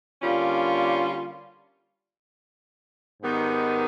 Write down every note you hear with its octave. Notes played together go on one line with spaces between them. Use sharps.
D3 G3 A#3 C#4 F4
G#2 D#3 G3 B3 D#4